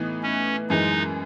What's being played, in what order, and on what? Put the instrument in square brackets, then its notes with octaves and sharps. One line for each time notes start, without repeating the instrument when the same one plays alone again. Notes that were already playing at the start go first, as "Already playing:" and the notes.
Already playing: [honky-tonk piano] A2 E3 B3 D#4
[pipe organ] C#4
[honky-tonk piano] F#2 E3 G#3 [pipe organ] D#4